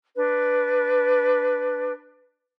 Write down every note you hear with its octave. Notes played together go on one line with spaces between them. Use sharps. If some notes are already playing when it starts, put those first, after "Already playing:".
D4 B4